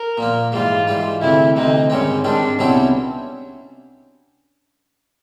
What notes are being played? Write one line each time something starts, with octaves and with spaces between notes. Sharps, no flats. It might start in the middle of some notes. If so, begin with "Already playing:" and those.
Already playing: A#4
A#2 F3 A#3
G#2 E3 G3 F4
G#2 E3 G3
D2 C3 E3 E4
D2 C3 E3 D#4
G#2 D#3 G3 C4 C#4
G#2 D#3 G3 C4 D4
C2 B2 G3 C4 C#4 E4